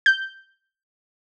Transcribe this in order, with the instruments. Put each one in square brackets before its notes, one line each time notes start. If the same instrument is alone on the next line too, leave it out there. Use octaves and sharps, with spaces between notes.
[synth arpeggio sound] G6